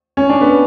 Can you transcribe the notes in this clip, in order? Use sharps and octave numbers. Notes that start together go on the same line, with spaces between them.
C#4
D4
B3